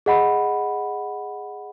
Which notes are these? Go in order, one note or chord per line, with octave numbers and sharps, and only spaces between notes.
G#4 D#5 F#5 B5